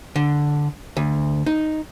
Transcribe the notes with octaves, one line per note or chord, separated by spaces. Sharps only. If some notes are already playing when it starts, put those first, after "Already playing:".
D3
D2
D#4